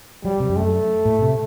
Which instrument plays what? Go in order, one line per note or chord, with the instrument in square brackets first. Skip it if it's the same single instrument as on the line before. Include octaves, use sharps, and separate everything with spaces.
[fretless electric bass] F#3 [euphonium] G3
[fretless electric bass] C3
F#2
[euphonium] A3
[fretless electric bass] A2
C3